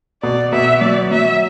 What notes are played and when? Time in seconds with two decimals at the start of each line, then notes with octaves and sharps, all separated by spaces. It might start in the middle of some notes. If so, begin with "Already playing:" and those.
0.23 B2 D5
0.52 B2 E5
0.81 F#3 D5
1.11 F#3 E5